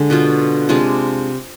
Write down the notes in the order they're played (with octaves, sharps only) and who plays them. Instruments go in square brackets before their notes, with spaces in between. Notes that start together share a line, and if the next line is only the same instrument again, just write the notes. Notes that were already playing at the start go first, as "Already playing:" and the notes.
Already playing: [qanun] D3 G#3
B2 B3 F4 B4
C3 G#3 D4 F4